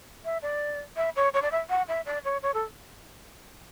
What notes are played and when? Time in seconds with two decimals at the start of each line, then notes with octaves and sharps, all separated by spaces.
0.25 E5
0.42 D5
0.97 E5
1.16 C#5
1.34 C#5
1.42 D5
1.52 E5
1.70 F#5
1.88 E5
2.06 D5
2.25 C#5
2.43 C#5
2.54 A4